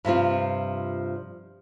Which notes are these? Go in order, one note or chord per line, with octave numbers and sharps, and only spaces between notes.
G2 C3 F3 F4